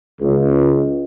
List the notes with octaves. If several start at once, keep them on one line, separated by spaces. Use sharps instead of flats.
C#2